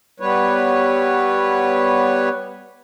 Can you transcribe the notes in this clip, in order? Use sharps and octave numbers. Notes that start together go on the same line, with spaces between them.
G3 B3 B4 C#5